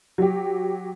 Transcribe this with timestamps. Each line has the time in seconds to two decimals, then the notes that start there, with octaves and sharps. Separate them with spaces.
0.18 F#3 G4